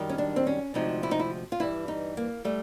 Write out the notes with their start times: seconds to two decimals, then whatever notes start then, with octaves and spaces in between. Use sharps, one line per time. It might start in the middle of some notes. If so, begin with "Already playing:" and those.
Already playing: F#2 D#3 G3
0.09 C#4
0.18 D4
0.36 C4
0.47 C#4
0.74 D2 C3 F3 G#3 D#4
1.03 E4
1.11 D#4
1.19 E4
1.52 F4
1.60 G2 E3 G3 E4
1.88 D#4
2.17 A#3
2.45 G3 A3